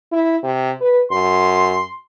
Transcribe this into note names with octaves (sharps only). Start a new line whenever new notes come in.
E4
C3
B4
F#2 C6